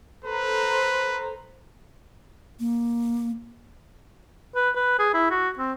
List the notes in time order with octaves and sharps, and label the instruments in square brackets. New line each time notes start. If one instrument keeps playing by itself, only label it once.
[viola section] A4 C5 A#5 [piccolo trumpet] B4
[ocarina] A#3
[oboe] B4
B4
G#4
E4
F#4
C4